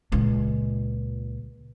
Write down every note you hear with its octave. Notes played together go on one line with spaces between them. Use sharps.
C#2 A#2